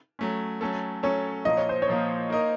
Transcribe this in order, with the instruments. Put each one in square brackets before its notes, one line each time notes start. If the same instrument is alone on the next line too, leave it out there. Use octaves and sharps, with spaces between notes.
[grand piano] F#3 A3 C#4
F#3 A3 C#4 A4
[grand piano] F#3 A3 C#4 A4 [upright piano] C#5
[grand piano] A#2 F3 A#3 [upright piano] D#5
[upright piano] C#5
C5
C#5
[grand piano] A#2 F3 A#3
A#3 D#4 A#4 D#5